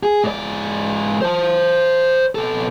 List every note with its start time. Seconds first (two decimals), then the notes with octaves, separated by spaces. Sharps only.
0.03 G#4
0.24 G#2 D5
1.21 C5 A5
2.35 B2 A4